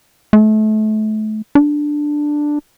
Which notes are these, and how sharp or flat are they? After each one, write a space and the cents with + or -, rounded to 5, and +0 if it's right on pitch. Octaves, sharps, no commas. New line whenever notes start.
A3 -30
D4 +5